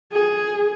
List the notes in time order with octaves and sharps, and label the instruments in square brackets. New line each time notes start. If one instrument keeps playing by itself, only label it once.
[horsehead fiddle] G#4